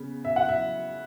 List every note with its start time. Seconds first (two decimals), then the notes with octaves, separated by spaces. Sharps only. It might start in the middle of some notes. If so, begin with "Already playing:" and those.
Already playing: C#3 B3
0.25 E5
0.36 F#5
0.49 E5